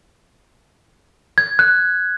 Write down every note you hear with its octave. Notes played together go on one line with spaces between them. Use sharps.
G#6
F#6